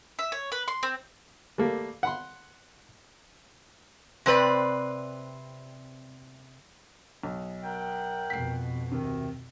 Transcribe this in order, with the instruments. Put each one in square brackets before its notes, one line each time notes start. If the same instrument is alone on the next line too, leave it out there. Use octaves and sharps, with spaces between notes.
[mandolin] E5
C#5
B4
C6
C4
[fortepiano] G3 A3 A#3
F#5 B5 C6
[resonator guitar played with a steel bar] C3 C4 B4 D5
[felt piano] B1
[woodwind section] A#4 F#5 G5
[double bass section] F2 B2 [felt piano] B6 C7
[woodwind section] D2 D#3 [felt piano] C3